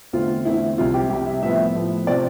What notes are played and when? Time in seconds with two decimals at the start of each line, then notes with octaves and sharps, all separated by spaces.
0.13 E2 D3 A3 C4 F4
0.45 E2 D3 A3 C4 E4
0.78 C2 C3 G3 F4
0.94 G4
1.09 C2 C3 G3 G4
1.26 E5
1.42 A2 F3 B3 E5
1.75 A2 F3 B3
2.07 C3 F3 C4 D5